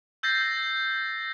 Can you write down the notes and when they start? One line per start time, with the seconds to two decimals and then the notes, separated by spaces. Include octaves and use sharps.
0.23 E6 G6 A6 A#6 C7